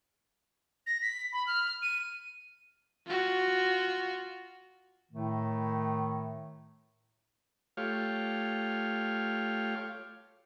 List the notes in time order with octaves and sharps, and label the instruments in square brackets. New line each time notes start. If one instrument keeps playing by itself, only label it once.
[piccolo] A#6
B6
B5
F6
D#7
[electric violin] F4 F#4
[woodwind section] A2 D#3 A3
[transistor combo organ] A3 F4 G4 C#5 F5